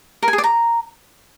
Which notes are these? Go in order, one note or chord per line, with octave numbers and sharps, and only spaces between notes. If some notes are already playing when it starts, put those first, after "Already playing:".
A#4
G#5
G#4
D5
A#5